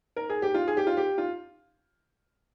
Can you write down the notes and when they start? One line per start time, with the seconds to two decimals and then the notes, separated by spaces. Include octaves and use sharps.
0.16 A#4
0.30 G#4
0.42 G4
0.54 F4
0.68 G#4
0.77 G4
0.87 F4
0.97 G4
1.18 F4